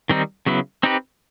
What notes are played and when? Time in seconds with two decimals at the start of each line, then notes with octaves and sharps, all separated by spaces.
0.09 D#3 G3 C4 D#4
0.46 C#3 F#3 B3 E4
0.83 C4 D#4 G4 B4